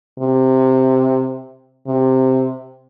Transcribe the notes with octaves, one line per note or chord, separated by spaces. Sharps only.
C3
C3